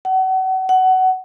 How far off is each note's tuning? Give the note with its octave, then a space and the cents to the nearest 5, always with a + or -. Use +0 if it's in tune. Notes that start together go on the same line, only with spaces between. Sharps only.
F#5 +35
F#5 +20